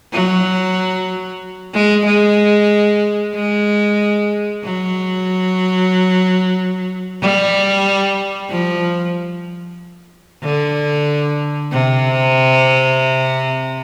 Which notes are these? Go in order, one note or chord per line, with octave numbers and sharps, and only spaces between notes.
F#3
G#3
G#3
G#3
F#3
G3
F3
D3
C3